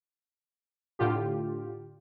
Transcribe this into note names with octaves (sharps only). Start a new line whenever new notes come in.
A2 D3 F4 G4